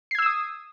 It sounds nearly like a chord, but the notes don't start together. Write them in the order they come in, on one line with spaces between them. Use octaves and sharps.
C7 G#6 E6 E7 D#6